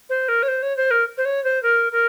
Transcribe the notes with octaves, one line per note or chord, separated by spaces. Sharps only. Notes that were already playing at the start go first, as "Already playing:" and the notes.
C5
A#4
C#5
C5
C#5
C5
A#4
C5
C#5
C5
A#4
A#4